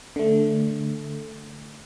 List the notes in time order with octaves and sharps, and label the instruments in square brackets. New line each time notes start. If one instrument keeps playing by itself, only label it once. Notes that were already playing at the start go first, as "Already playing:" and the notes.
[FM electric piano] D3 A3